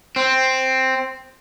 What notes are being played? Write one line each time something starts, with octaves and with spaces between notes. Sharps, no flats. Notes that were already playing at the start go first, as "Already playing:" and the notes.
C4